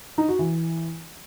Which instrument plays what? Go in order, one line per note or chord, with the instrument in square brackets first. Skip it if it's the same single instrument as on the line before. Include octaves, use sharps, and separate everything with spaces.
[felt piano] D#4
F#4
E3